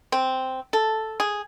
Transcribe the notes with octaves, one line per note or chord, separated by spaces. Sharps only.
C4
A4
G#4